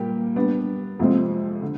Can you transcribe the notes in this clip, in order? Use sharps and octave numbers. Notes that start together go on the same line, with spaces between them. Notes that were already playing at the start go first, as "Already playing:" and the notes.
Already playing: A#2 G3 A#3 G4
G3 B3 D4
F2 C3 F3 G#3 C4
D3